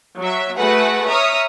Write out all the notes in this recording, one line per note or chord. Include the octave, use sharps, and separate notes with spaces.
F#3 E5
A3 F#4 G#4 B4 F#5
C#5 E5 A#5 D#6 F6